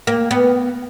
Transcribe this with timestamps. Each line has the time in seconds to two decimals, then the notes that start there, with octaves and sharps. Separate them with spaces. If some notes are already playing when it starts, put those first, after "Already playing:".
0.07 A#3
0.31 B3